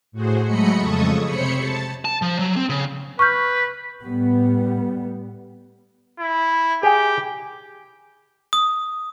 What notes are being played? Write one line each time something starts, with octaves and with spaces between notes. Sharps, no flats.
A2 F#4 G#4 C5
F#3 G#3 A3 D#5 B5 C#7
F2 C#3 G#3 A4 C#6 D#6
C3 C5 C#5 B5 C#7
A5
A5
F3
F#3
C4
C#3
B4 C#6 F6 G6
A2 G3 B3
E4
G4 G#4 G5
D#6